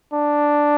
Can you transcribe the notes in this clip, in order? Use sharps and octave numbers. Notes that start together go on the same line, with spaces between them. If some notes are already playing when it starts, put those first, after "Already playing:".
D4